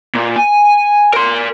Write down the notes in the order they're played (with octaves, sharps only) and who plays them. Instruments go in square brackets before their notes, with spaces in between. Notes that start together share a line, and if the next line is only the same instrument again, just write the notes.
[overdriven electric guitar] A#2
G#5
A#4 C6